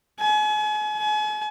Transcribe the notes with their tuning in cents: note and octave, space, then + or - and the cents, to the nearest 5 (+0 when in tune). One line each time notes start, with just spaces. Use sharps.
G#5 +40
G#5 +40